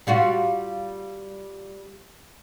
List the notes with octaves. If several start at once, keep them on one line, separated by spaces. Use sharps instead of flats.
G3 F4 F#4